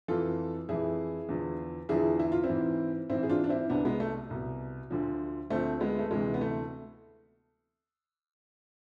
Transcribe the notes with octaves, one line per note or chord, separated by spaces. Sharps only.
F2 E3 F4 A4
F2 E3 E4 G#4
E2 D3 F3
E2 D3 F3 E4 G#4
E4
F4
C4 E4
G#2 E3
G#2 E3 C4 E4
G#4
D4 F4
D4
C4 E4
C2 B2 B3 D4
G#3 B3
A3
C2 B2
D2 D3 F3
D2 D3 F3 A3 C4
G#3 B3
A3
D2 C3 E3 G#3
B3
A3